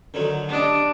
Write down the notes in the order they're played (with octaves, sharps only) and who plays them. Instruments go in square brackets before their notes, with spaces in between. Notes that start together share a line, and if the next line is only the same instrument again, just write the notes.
[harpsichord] D3 D#3 F#3
[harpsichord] G3 D#5 [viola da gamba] D4